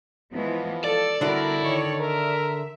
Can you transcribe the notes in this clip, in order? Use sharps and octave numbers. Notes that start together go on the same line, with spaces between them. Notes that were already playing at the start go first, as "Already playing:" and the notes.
E3 F3 G#3 B3
A4 D5
D3 G3 B3 D4 E4 F#4 A#4
D#3 C#5
A#4 E5